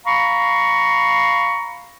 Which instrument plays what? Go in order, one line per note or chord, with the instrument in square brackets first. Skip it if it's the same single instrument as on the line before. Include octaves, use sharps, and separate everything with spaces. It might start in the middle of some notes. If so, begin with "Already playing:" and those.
[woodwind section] F5 A#5 B5 C#6